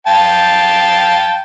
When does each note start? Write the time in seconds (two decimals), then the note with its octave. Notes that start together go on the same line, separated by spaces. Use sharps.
0.07 F5 G5 A5